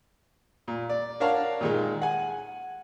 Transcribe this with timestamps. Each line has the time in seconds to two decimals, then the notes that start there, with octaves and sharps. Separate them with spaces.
0.68 A#2
0.89 D5
1.20 D4 A#4 C#5 F5 F#5 A5
1.61 A#2 D#3 G#3
2.02 F#5 G#5